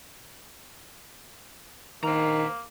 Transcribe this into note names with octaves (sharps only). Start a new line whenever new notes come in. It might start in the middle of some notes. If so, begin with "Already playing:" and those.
D#3 A#3 C5 A#5